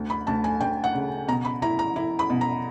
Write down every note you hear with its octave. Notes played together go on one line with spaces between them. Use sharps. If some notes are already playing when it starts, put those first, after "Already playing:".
Already playing: D2
B5
D2 A5
G#5
D2 G5
F#5
C#3
B2 A#5
B5
E4 A#5
A#5
E4
B5
B2
A#5